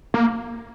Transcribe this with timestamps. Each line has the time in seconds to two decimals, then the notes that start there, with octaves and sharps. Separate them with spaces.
0.14 A#3